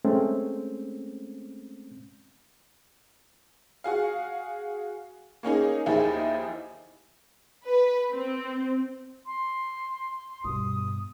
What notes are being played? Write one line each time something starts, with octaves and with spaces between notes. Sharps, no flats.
G#3 A3 C4 C#4
F#4 G#4 F5
A#3 C#4 D#4 G#4
D#2 F3 D#4 E4 G#4
B4
C4
C6
G2 B2 D#6